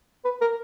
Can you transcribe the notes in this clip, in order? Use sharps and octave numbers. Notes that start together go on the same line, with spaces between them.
B4
A#4